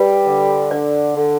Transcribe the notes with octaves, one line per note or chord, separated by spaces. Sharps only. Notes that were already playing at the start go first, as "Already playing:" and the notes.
Already playing: G3 B4
D3
D3 D5
D3